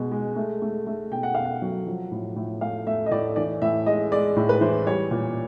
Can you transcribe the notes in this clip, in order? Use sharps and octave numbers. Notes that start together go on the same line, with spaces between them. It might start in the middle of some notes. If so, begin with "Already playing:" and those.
Already playing: B2 G#3
G#3
A3
A3
A3
B2 G5
F#5
B2 F5
F#5
F#3
F3
A2
A2
A3 F5
A3 E5
D#5
A2 D5
E3 D5
A2 E5
G#3 D#5
G#3 D5
A2
B4
E3 C5
G3 C#5
A#2